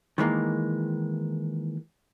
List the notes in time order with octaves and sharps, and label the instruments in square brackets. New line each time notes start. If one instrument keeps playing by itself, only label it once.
[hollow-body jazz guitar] D#3 E3 G#3 A#3